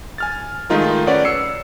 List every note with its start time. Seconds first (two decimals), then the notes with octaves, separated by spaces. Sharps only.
0.18 G#5 F6 A6
0.70 D#3 G#3 A3 D#4 F4 A#4
1.07 C#4 B4 C#5 D5 F#5
1.25 E6 C7 C#7